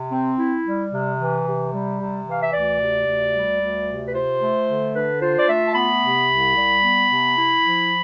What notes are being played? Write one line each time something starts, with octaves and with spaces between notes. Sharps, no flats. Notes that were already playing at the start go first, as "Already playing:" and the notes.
Already playing: C3
C4
E4
G3
C3
E3
C3
G3
C3
E3 F5
E5
D2 D5
C3
D2
G3
D2
C3
B4
F4 C5
A3
D3
D4 B4
F4 C5
D5
A3 E5
A5
B3 B5
C3
C2
G3
B3
C3
E4
F3